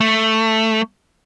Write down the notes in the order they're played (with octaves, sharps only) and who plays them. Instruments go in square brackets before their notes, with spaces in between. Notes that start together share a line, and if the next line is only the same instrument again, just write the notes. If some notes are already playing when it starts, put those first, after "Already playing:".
[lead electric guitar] A3